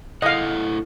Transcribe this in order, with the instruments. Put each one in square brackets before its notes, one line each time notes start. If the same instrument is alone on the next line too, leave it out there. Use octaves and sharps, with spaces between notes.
[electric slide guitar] E4 A4 F#5 [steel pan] D#5 F5